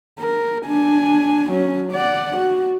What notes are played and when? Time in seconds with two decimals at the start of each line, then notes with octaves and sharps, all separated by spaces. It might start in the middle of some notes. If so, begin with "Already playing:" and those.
0.20 A#4
0.66 D4 G#5
1.51 F#3 C#4
1.92 D5 F#5
2.38 F#4